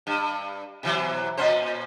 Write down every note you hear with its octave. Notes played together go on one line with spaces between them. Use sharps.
G2
B2 E3 F#3
A#2 C#4 C5